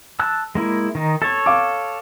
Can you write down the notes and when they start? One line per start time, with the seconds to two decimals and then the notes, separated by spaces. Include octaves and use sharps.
0.20 A5 E6 F#6
0.55 G#3 A#3 E4
0.95 D#3 D#4
1.22 A4 C#5 A6
1.46 F5 D6